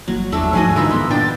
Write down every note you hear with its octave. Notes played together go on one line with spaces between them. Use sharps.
G1 F#3 G3 A#3
E2 F#3 A3 D4 E6
D2 G#2 F3 G3 G#3 F#4 D#5 G#5
G2 D3 E3 D#4 F4 A#4 B4 E6
B3 C6
A#2 D4 G5 A6